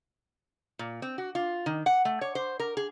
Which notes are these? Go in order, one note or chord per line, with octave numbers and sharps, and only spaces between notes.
A#2
C4
F#4
F4
D#3
F#5
A3
C#5
C5
A#4
G#4